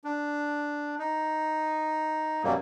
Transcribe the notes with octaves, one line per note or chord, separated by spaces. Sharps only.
D4
D#4
F#2 B2 F#3 G3 A#3